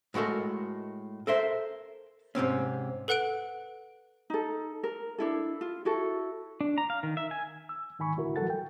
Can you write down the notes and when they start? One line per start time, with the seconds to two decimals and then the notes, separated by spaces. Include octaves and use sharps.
0.14 A2 G#3 F#4 A4 A#4
1.27 A4 A#4 C5 E5
2.35 G#2 C3 C4 C#4
3.08 A4 B4 F#5 F#6 D7
4.30 D#4 A4
4.84 A#4
5.18 D4 E4 A4
5.61 F4
5.85 E4 F#4 A4
6.61 D4
6.78 A#5
6.90 F5
7.03 D#3
7.17 E5
7.31 G#5
7.69 E6
7.99 G#2 D#3 G#5 B5 C#6
8.16 C2 A2 D3 E4 F#4 A#4
8.36 E3 F#3 G3 A4 F#5 A6
8.50 G5